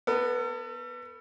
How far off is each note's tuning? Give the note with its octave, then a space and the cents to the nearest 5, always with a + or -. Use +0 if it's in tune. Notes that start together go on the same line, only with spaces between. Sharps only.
B3 -5 A4 +40